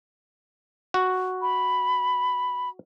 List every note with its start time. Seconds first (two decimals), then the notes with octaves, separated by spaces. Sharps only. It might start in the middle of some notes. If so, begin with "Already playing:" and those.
0.94 F#4
1.42 B5